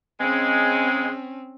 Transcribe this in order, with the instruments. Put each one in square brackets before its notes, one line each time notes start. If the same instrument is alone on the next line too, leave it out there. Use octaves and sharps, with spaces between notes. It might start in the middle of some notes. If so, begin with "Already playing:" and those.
[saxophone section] C#3 G#3 [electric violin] C4 C#4